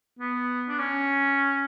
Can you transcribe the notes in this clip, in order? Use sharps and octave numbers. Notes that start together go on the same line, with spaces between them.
B3
D4
C#4